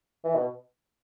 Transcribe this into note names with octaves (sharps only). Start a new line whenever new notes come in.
E3
B2